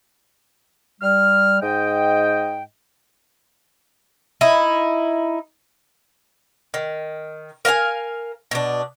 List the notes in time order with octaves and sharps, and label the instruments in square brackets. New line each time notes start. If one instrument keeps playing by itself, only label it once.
[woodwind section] G3 F6
G#2 D#5 G5
[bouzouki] D#4 E4
D#3
A#4 F5 G5 G#5
B2 D4